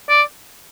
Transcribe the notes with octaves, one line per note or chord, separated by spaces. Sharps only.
D5